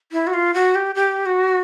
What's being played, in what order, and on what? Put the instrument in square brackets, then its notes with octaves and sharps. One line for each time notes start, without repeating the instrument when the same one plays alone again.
[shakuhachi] E4
F#4
F4
F#4
G4
G4
F#4